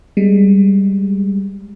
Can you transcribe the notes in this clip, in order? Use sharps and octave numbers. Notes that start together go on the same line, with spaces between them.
G3 G#3